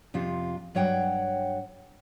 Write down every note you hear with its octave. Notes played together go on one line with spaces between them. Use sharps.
F2 C3 F4
G2 F#3 C#5 F#5 G5